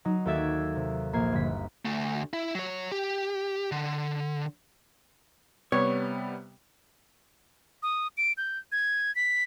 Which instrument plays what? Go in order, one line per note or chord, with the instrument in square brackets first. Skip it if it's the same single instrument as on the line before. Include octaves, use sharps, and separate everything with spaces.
[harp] F#3 D#4
D#2 F#4 A4 D5 E5 G#6
C3
A#1 A#3 G#6 C7
G1 B6
[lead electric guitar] D2 A3
E4
F#3 C#5
G4
D3
[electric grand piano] C3 G3 B3 [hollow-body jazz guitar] C#5
[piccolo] D#6
D7
G6
G#6
B6